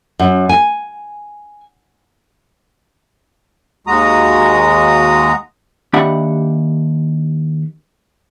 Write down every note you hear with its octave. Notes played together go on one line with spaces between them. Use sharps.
F#2
G#5
D#2 G#3 F#4 A#5 D#6
D#2 D4 G4 E5 F#5 B5